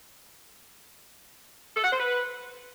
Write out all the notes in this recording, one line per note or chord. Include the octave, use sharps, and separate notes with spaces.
A4
F#5
C5
B4